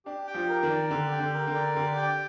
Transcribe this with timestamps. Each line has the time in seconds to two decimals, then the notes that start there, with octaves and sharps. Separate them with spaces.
0.05 D4 G4
0.27 G5
0.34 F3
0.49 A#4
0.63 D#3
0.70 D5
0.90 D3 G4
1.12 G5
1.19 D3
1.34 A#4
1.47 D3
1.55 D5
1.76 D3 G4
1.96 G5